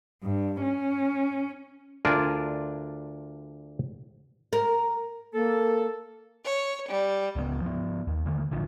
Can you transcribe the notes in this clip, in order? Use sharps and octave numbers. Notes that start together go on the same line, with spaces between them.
G2
C#4
D2 D4 F4 A#4 D5 G#5
A#4
A#3 A4
C#5
G3
C#2 C#3 B3
F3 B3
D#2
D3 D#3 A3
A1 D3 F3